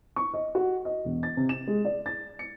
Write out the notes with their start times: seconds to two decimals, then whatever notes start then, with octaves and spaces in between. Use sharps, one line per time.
0.16 C#6
0.34 D#5
0.55 F#4
0.85 D#5
1.05 E1
1.23 A6
1.37 C3
1.49 E7
1.67 G#3
1.85 D5
2.06 A6
2.39 C#7